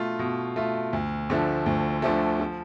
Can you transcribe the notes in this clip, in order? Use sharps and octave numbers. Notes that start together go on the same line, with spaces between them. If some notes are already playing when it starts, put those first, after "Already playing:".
Already playing: B2 A3 F4
B2
A3 F4
D2
D3 F3 A3
D2
D3 F3 A3
F3